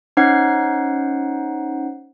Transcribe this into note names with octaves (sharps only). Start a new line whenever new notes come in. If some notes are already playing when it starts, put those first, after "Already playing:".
C#4 D#4 C5 F#5 C7